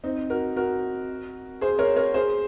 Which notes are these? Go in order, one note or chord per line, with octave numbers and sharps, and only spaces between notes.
C4 D#4
F#4 A#4
F#4 A#4
G#4 C5
A#4 C#5
A#4 C#5
G#4 C5